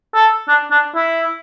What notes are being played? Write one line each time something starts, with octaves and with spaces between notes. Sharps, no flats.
A4
D4
D4
E4